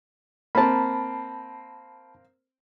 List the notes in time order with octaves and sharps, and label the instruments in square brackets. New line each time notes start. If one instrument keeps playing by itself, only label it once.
[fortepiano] A#3 C4 [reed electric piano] A5 B5